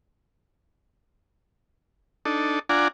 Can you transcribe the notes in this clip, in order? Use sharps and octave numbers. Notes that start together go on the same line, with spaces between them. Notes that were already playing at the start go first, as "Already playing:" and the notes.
D4 D#4 A4
D4 F4 D5 F#5 G#5 A#5